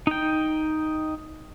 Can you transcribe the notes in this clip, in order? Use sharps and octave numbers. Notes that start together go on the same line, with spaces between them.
D#4 G5